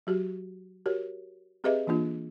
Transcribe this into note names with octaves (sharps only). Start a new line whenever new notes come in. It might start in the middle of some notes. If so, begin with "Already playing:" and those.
F#3 F#4 G4
F#4 G4 A#4 C#5
C4 G4 G#4 B4 D#5 E5
E3 A#3 D4 F4